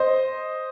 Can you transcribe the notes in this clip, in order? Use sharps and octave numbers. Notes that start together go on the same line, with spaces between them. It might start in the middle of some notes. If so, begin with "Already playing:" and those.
Already playing: C5 D#5